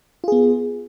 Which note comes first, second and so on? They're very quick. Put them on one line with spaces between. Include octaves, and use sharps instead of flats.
F4 G#4 B3